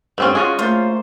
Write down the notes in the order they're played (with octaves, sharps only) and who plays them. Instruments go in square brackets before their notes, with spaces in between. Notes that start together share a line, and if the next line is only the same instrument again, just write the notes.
[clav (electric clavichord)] G2 [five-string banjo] A3 C4 C#4
[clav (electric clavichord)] G#3 F4 F#4 [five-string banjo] C#4 G#4
[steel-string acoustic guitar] A3 A#3 C5 [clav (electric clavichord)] F4